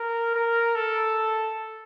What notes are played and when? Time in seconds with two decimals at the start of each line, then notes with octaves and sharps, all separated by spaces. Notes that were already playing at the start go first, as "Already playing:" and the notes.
Already playing: A#4
0.35 A#4
0.75 A4